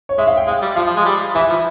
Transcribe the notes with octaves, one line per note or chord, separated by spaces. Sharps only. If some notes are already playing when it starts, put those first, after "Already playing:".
C#5
G#3 E5
F5
G5
G#3 F5
G3
F3 F5
F3
G#3
G3
E3 E5
F3